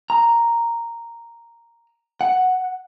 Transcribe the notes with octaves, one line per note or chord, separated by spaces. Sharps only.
A#5
F#5